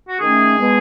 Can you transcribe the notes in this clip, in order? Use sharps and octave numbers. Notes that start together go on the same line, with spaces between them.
F#4
D#3 A3 C#4 G#4
B2 G#3 B3